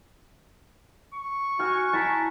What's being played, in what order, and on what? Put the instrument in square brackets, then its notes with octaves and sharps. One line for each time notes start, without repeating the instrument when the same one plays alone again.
[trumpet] C#6
[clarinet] F#4 [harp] G#5 F6 F#6
[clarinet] E4 [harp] A5 A#5